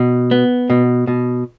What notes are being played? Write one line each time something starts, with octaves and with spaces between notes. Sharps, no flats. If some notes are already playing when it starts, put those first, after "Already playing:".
Already playing: B2
B3
B2
B2